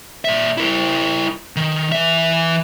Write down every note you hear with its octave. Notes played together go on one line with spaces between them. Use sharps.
A#2 E5
E4 A#4
D#3
E3 E5